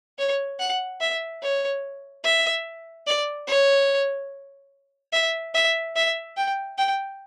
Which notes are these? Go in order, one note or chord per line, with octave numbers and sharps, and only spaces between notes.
C#5
F#5
E5
C#5
E5
D5
C#5
E5
E5
E5
G5
G5